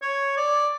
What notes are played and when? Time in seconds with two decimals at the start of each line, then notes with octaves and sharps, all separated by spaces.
0.02 C#5
0.37 D5